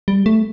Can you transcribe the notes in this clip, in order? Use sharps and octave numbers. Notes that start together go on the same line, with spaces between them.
G3
A3